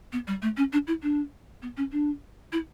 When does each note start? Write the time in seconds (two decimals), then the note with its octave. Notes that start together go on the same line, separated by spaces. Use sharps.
0.13 B3
0.27 G3
0.42 A3
0.57 C#4
0.73 D4
0.87 E4
1.03 D4
1.62 B3
1.77 C#4
1.92 D4
2.52 E4